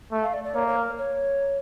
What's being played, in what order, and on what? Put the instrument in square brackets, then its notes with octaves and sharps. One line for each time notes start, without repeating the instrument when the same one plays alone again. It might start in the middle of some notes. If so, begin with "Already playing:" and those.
[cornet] A3
[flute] F5
D5
D5
[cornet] A#3 [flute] C#5
[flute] C#5
A#4
C#5